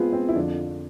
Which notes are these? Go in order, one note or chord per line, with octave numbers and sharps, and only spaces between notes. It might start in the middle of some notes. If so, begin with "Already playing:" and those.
Already playing: G#2 B3 C4 F4 G#4
C4
E4
F2 D3 F3 D4